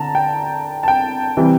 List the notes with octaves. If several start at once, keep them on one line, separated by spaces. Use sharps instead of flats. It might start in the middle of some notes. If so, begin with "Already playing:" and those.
Already playing: D3 A5 A#5
G5
A5
G5
C3 E3 G3